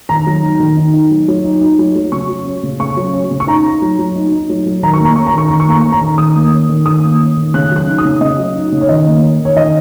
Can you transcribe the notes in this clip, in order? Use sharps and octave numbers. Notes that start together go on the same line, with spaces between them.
D#3 A#5
F#3
D#4
D#3
D#4
D#4
F#3
F#3
D#4
D#4
F#3
F#3
C#3 C#6
F#3
C#4
C#3
C#3 C#6
F#3
C#4
C#3
C#6
D#4 A#5
D#4
F#3
F#3
D#4
D#4
F#3
F#3
D#3 A#5
C#6
A#3
A#5
C#4 C#6
A#5
D#3 C#6
D#3 A#5
C#6
A#3 A#5
C#4 C#6
A#5
D#3
D#3 D#6
A#3
C#4
D#3
D#3 D#6
A#3
C#4
D#3
C#3 F#6
F#3
F#6
D#4
D#6
C#3
C#3 D#5
F#3
D#4
C#3
C#5
D#3 D#5
A#3
C#4
D#3
C#5
D#3 D#5